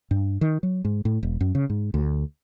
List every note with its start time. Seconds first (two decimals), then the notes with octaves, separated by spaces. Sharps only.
0.11 G2
0.41 D#3
0.63 F#3
0.85 G#2
1.05 A2
1.23 E1
1.41 F#2
1.55 C#3
1.70 G#2
1.94 D2